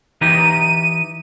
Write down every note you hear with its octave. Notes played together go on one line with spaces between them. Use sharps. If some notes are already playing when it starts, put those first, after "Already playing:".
E3 D#4 G4 D#7